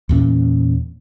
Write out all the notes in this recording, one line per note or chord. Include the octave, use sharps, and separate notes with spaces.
E2 A#2 C#4